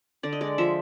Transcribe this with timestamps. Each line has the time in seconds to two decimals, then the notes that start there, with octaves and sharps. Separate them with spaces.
0.23 D3 D5
0.33 D#5
0.41 G#3 D5
0.58 F3 E5